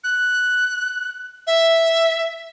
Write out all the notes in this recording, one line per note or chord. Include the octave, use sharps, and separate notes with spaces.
F#6
E5